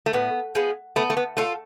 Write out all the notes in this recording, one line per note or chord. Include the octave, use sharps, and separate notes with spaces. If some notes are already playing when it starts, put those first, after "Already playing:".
A3
A2 B3
F3 G#3 B3
A3 B3
A3
B3
A3 F4 A4